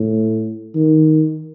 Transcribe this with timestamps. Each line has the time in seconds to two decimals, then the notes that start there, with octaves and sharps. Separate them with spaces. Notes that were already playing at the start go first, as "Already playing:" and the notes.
Already playing: A2
0.75 D#3